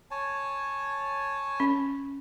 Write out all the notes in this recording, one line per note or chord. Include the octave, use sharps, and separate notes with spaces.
C#5 G#5 A5
C#4